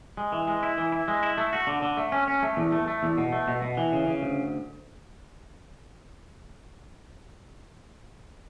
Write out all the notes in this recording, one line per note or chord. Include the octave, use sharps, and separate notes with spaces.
G#3
E3
G#3
E4
E3
E4
G#3
E4
A3
F#4
D3
D3
A3
C#4
C#4
A3
E2
A3
A3
E2
B2
A3
B2
B2
E3
C#3
C#3
D2